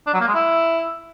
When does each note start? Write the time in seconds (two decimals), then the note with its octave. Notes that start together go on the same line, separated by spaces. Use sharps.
0.07 D4
0.14 F#3
0.21 A#3
0.28 G#3
0.35 E4